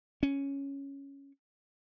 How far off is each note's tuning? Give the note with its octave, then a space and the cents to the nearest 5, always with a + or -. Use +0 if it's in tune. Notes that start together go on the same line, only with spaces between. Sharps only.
C#4 +0